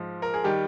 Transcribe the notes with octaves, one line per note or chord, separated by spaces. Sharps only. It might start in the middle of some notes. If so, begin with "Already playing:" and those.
Already playing: G#2 F3
A#4
G#4
D#3 G3 G4